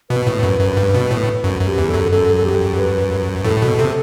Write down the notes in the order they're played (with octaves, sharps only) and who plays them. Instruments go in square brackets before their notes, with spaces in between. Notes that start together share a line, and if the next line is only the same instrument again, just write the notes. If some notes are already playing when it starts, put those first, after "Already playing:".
[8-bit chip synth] B2 [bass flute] B4
[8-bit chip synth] A2
F#2
F#2
G2
B2
A2
F#2
F#2
[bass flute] G4
[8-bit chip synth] E2
[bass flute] A4
[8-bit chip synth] F#2
[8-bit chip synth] F#2 [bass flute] A4
[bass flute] A4
G4
B4
[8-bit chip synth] A2 [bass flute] A4
[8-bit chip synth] B2
[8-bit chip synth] C3 [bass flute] A4